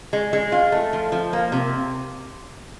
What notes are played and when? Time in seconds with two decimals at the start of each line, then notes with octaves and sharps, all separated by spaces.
0.13 G#3
0.33 G#3
0.52 F4
0.72 A3
0.93 F3
1.12 F3
1.33 A#3
1.52 C3